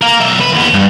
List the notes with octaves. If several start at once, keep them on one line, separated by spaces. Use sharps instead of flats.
A#4 F5
B1 E5
B4
D#2 B3
G2